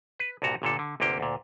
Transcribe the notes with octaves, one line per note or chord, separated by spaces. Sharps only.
B4
C2 G2 A#2 F#4 A#5
G1 A#2 D3 A4
D3
G1 D2 C3 A#3 G4 G5
D2 A#2